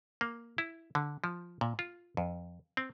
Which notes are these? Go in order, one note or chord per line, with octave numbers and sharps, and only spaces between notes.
A#3
E4
D3
F3
A#2
F4
F2
C4